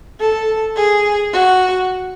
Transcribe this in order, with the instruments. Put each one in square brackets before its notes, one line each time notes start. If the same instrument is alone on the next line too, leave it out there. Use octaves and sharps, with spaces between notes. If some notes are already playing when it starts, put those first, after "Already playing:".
[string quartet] A4
G#4
F#4